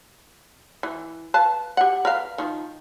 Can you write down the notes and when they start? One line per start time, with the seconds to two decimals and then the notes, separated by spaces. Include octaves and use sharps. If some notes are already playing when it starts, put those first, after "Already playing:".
0.83 E3
1.34 B4 F5 A5
1.77 G4 F#5
2.05 A#4 B4 F5
2.38 D#3 F3